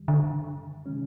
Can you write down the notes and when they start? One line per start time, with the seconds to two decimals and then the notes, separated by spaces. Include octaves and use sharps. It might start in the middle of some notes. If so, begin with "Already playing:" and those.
Already playing: F#2 D#3 G3
0.08 D3
0.86 C3 D#3 G#3 C#4